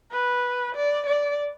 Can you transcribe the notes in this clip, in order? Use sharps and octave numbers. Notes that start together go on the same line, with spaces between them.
B4
D5
D5